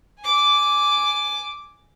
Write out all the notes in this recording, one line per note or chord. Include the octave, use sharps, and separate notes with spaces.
G#5 D6